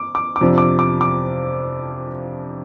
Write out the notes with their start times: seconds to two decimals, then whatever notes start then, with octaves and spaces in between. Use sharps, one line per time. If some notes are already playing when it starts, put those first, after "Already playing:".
Already playing: D6
0.15 D6
0.36 D6
0.41 F2 C3 F3 D4
0.58 D6
0.79 D6
1.01 D6